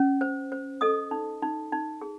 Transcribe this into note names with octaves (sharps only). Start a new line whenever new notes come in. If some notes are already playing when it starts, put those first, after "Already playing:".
Already playing: C#4
C5
C5
A4 D#5 D#6
D#4
D#4
D#4
G#4